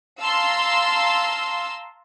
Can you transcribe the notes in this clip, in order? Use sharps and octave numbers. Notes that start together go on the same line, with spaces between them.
F5 A5 A#5 C6 E6